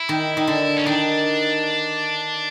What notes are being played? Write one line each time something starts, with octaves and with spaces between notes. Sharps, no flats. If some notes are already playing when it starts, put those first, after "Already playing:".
Already playing: E4
D#3
D#3
D3
C#4
D#3 D4